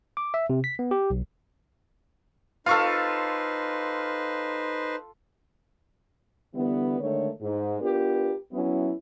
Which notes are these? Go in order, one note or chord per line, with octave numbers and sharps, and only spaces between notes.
D6
E5
C3
B6
B3
G4
B1
D#4 F4 A4 B4 C5 F5 C#6
D3 E3 G3 B3
D3 D#3 G#3 A3 A4 C#5
G#2
B3 D4 F4 G4 A#4 B4
F#3 B3 C#4 E4